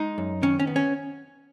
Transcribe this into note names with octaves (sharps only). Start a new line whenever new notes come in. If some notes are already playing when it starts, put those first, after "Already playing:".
Already playing: G#3 D#4
F#2
D#3 C#4
C#4
B3
C#4